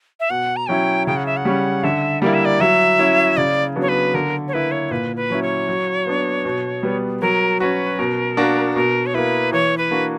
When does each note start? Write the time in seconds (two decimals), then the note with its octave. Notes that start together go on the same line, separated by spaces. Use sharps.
0.20 E5
0.30 B2 F#5
0.56 A#5
0.68 F#3 C#4 E4 G5
1.07 C#3 G5
1.17 F#5
1.26 E5
1.37 F#5
1.45 G3 C#4
1.83 D3 E5
2.22 G3 A#3 E4 D5
2.34 E5
2.45 D5
2.60 F#3 E5
2.99 C#4 E4
3.37 C#3 D5
3.76 F#3 B3 D4
3.82 C#5
3.89 B4
4.14 D3 A#4
4.48 C#5
4.53 A#3 E4 B4
4.71 C#5
4.91 A#2 B4
5.16 B4
5.30 F#3 C#4 E4
5.42 C#5
5.68 F#3
6.07 B3 D4
6.45 B2
6.83 G3 B3
7.21 F#3 A#4
7.60 C#4 F#4 B4
7.99 B2 A#4
8.37 A#3 D4 F#4
8.76 B2 A#4
9.06 C#5
9.14 A#3 E4 B4
9.53 E3 C#5
9.78 B4
9.91 A#3 D4 F#4